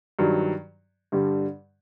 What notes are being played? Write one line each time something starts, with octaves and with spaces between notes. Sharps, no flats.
G2 D#3 F#3
G2 D3 G3